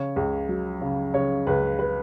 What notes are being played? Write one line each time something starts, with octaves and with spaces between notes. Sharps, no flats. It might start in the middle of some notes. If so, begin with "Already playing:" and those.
Already playing: C#3 C#5
C#2
F#3
C#3
C#3 C#5
C#2 B4
B4